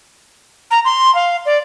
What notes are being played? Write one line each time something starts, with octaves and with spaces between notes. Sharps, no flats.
A#5
C6
F5
D5